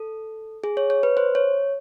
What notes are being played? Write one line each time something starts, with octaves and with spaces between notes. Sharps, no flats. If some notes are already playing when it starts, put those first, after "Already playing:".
Already playing: A4
G#4
C#5
C#5
B4
C5
C#5